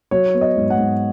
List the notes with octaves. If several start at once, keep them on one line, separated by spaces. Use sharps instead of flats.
F#3 C#5
B3
D#5
G#2
F#5
G#2